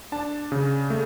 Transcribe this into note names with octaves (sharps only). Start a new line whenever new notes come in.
D4 A5
C#3
A3